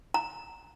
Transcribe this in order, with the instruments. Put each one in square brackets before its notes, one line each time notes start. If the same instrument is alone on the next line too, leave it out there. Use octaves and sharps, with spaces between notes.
[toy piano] A#5